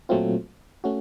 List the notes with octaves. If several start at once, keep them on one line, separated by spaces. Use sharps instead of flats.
A#2 F#3 A3 C4 F4
A3 C#4 F#4